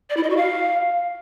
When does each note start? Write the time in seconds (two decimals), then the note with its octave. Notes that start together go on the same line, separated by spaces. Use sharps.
0.10 D5
0.17 E4
0.23 D#5
0.30 F#4
0.37 F5